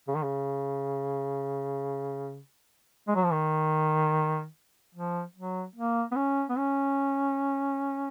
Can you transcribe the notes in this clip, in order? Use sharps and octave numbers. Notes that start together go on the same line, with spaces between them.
C#3
D#3
C#3
G#3
F#3
F3
D#3
F3
F#3
A#3
B3
C#4
B3
C#4